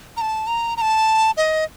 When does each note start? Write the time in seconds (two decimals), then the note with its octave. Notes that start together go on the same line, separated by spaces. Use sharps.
0.17 A#5
0.21 A5
0.47 A#5
0.77 A#5
0.81 A5
1.37 D#5